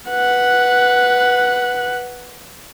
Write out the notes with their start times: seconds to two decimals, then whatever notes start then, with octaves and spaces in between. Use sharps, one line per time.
0.10 B4 F#5